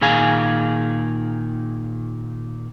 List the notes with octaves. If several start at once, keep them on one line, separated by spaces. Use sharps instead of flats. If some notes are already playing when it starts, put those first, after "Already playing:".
A#2 D#3 G#4 F5 G#5